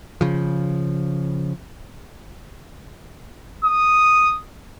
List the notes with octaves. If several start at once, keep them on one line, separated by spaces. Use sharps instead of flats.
C#3 F3
D#6